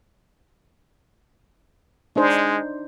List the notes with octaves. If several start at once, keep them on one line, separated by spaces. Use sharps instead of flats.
G#3 D4 D#4 C5